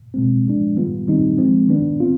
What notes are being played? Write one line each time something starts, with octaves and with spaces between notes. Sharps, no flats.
B2 G#3 C4
F3 G#3 D4
D#3 G3 B3 F4
D#3 G3 C4 D#4
F3 G#3 C4
D#3 B3 D4
C4 F4